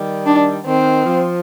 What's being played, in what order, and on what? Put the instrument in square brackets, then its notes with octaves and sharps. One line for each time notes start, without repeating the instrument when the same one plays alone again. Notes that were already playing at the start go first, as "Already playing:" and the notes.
Already playing: [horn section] D#3 G3
[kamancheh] D4
[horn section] D#3 [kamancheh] C4
[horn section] F3